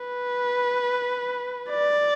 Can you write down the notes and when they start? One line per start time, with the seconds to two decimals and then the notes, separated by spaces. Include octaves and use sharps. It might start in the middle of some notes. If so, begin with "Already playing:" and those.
Already playing: B4
1.70 D5